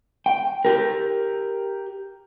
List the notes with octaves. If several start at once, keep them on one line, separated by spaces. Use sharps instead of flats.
G5
G4 A#4